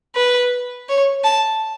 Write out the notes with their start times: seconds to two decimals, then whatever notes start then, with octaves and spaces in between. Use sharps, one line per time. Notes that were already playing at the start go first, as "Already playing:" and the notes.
0.15 B4
0.89 C#5
1.24 A5